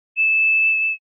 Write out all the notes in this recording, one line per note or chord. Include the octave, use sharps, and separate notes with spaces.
E7